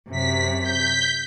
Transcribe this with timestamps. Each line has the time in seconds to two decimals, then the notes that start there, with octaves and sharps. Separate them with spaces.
0.11 F#2 C3 B6
0.63 G6 B6